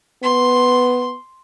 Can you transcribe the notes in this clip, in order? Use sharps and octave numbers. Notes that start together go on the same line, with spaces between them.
B3 C6